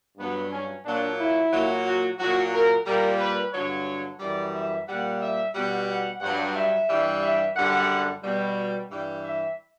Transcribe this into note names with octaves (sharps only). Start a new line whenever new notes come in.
G2 F#3 B3
C#4
A#2 F#3 D4
E4
A#2 F#3
F#4
A#2 F#3 F#4
A#4
A#2 G3 A#4
B4
G2 D3 F#3 C#5
F#2 E3 G3 D5
E5
A#2 G3 F#5
E5
B2 G3 F#5
F#5
G2 F#3 F#5
E5
G2 E3 G3
E5
F#2 D3 G3 F#5
B2 G3
G2 E3 G3
E5